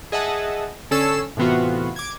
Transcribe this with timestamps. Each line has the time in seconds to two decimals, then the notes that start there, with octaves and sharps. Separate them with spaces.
0.12 G#4 D#5 E5 F#5 A5
0.91 D3 C#4 A4 E6 C7 C#7
1.37 A2 C3 E3 B3 F4 F#4
1.96 D6 G#6